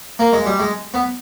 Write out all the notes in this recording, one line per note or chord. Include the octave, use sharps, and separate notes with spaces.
A#3
G#3
G3
G#3
B3